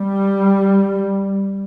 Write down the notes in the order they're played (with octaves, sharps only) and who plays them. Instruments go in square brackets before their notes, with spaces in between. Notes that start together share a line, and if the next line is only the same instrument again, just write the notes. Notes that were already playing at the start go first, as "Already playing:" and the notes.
Already playing: [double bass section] G3